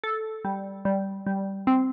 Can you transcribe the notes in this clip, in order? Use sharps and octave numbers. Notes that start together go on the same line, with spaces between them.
A4
G3
G3
G3
C4